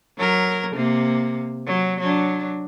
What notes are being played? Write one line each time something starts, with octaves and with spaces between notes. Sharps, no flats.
F#3 A#4
C3 A#3
F#3
F#3 D4